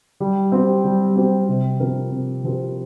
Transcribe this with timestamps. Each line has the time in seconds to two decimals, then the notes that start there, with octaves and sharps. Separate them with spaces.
0.20 G3
0.52 C4 G4 C5
0.84 G3
1.15 C4 G4 C5
1.48 C3
1.80 F3 C4 G4 A#4
2.11 C3
2.44 F3 C4 G4 A#4